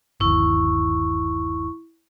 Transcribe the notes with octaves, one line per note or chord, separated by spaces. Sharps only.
G1 D#2 E4 C#6